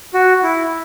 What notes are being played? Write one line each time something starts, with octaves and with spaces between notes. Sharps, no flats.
F#4
E4